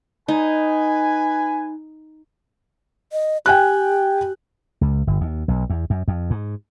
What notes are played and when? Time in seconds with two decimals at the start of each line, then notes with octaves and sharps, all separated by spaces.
0.28 D#4 B4 G#5
3.12 D#5
3.46 G4 G5 G#5 F#6
4.81 C#2
5.07 G1
5.21 D#2
5.48 B1
5.70 E2
5.90 F#2
6.08 F2
6.30 G#2